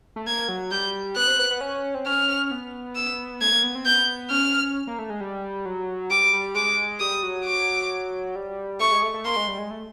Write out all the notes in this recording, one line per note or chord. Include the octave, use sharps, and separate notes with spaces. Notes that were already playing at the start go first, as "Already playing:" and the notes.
A3
A#3 G#6
F#3
G3 G6
B3 F#6
C4
B3
B3
C#4
C4
C#4 F6
B3
E6
A3 G#6
A#3
B3
C4
B3 G6
C#4 F6
A#3
A3
G#3
G3
F#3
G3 D6
G3
G#3 D6
G3 D#6
F#3
D6
G3
A3 C#6
G#3
A3
A3
A#3 C6
G#3
G3
G#3
A3